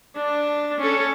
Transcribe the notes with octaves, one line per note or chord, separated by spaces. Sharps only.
D4
C#4 A4